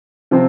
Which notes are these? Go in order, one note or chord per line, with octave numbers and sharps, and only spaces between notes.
C3 F3 C4